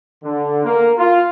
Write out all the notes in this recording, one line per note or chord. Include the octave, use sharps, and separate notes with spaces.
D3
A#3
F4